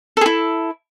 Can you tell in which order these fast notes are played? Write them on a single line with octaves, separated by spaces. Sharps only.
A4 G#4 E4